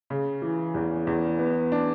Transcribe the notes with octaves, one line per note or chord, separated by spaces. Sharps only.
C#3
E3
E2
E2
B3
D4